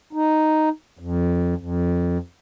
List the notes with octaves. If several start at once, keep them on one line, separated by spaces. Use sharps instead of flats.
D#4
F2
F2